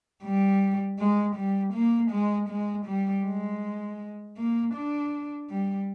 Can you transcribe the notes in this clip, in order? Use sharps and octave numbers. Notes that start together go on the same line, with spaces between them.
G3
G#3
G3
A#3
G#3
G#3
G3
G#3
A#3
D4
G3